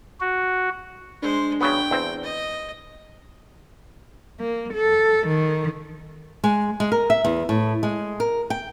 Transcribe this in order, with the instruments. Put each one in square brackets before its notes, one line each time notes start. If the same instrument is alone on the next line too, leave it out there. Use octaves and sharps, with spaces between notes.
[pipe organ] F#4
[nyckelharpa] G#3 C5 [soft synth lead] D4
[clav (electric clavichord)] C#3 F#3 B3 [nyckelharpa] G5
[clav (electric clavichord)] E2 C4
[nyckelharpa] D#5
[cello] A#3
A4
D#3
[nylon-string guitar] G#3
G#3
A#4
E5
E2
A2
G#3
A#4
G5